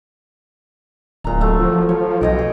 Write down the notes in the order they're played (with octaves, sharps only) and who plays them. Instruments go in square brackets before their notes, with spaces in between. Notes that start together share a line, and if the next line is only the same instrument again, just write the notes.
[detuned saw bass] D1 [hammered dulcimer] A#2 A#5
[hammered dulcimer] F#3 A3
[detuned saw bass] F3
[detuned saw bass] F3 [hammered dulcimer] C#5
[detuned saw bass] B1 [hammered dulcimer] C#5 D#5 G5
[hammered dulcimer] G#4